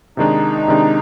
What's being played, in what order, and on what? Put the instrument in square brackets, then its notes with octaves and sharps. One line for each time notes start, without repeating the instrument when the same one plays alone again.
[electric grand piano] C3 D#3 G#3 D4 [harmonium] D#4
[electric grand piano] C3 D#3 G#3 D4